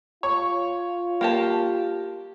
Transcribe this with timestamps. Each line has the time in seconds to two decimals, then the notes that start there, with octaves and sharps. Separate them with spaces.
0.23 F4 C#5
1.21 A#3 G4 A5